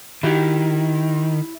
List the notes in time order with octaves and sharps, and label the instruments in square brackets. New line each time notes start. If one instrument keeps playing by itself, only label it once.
[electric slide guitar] D#3 [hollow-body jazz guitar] E4 F#4 G4